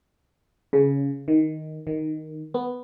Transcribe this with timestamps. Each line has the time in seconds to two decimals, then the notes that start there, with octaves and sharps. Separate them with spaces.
0.73 C#3
1.28 D#3
1.87 D#3
2.54 B3